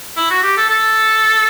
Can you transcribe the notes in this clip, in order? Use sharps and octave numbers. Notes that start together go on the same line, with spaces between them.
E4
F#4
G4
A4
A4